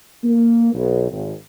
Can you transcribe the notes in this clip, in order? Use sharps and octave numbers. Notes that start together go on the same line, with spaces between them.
A#3
B1
G#1